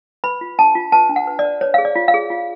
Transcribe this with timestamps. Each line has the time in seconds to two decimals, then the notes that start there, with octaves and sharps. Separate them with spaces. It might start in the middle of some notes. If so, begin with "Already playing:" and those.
0.24 B4 B5
0.41 F4
0.59 D4 A5
0.75 F4
0.92 B4 A5
1.09 D4
1.16 F#5
1.27 B4
1.39 D5
1.45 B4
1.61 B4 C#5
1.74 G#4 F5
1.85 D5
1.96 F4
2.08 F5
2.14 G#4
2.30 F4